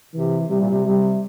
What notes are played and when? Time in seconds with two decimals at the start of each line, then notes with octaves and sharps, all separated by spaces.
0.13 C3 E3
0.49 C3 G3
0.60 A#2
0.70 C3
0.85 C3 G3